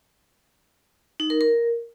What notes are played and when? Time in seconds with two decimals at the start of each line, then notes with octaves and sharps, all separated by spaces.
1.20 D#4
1.30 A#4
1.41 A#4